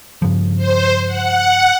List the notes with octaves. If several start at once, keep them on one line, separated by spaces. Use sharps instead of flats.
G2 C#3 F3
C5
F#5